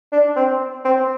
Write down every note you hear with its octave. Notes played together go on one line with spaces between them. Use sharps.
D4
C4
C4